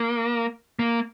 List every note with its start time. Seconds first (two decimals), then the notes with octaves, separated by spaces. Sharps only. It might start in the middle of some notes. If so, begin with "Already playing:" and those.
Already playing: A#3
0.79 A#3